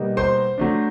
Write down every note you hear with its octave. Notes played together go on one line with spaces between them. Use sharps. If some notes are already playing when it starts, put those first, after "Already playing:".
Already playing: B2 G3 A#3 D#4
C5 C6
F#3 A3 D4